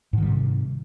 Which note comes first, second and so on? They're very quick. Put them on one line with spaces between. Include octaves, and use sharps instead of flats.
G#2 D#3 G3 C3